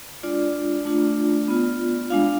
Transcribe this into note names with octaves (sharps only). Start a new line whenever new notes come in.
G#3 D4 F4 D5
A3 D4 F4
B3 F4
G#3 D4 F4 F5